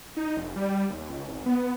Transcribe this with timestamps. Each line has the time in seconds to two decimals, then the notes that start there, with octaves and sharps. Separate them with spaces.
0.17 D#4
0.37 F1
0.56 G3
0.90 D#2
1.09 C#2
1.29 G#1
1.46 B3